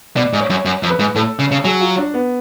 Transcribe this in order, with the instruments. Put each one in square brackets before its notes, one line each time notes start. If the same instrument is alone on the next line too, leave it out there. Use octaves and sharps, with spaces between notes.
[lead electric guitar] B2 [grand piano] D5
[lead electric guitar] G#2
[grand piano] C#5
[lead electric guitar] F#2
F#2
F2
[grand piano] B4
[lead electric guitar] G#2
[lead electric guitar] A2 [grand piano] A4
[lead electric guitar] C#3
C#3
[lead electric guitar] F#3 [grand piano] G#4
[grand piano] F4
D4
B3